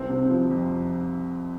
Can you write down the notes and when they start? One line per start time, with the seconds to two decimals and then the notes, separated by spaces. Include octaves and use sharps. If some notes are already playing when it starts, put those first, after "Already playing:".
Already playing: C2 C4
0.09 C3
0.30 F3
0.50 F2